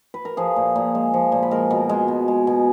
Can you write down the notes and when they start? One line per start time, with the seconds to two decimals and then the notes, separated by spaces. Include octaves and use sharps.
0.14 B4
0.25 A#4
0.37 F3 G#4
0.56 A#2
0.76 A#2
0.95 G#3
1.14 F3
1.32 A#2
1.43 B4
1.51 G#3 A#4
1.71 B2
1.89 G#3
2.08 B2
2.28 G#3
2.47 B2